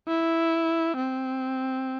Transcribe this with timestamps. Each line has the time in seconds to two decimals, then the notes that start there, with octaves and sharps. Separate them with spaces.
0.08 E4
0.97 C4